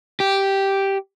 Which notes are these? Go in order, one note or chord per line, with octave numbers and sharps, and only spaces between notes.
G4